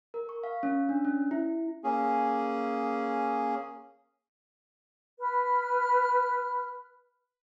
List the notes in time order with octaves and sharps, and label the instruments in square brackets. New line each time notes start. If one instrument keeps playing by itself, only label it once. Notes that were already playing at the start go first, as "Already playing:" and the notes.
[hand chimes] A#4
C#6
F5
C#4
D4
C#4
E4
[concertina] A#3 C#4 G#4
[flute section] B4 B5 F6